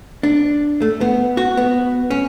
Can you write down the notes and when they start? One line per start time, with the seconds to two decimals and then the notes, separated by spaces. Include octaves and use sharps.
0.23 D4
0.82 A3
1.01 B3
1.37 F#4
1.57 B3
2.10 C#4